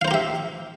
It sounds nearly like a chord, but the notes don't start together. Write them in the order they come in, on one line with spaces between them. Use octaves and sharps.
F5 C5 A#5 G4 E5